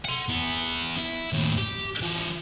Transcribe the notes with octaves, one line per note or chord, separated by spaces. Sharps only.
F#5 C6
B3 E4
E4
D#2 A2
G4
E3 F4